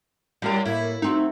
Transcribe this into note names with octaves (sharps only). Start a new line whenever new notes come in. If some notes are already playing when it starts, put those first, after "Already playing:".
A2 G3 F#4 A#4
A2 A#3 E4
A3 C4 D#4 F#4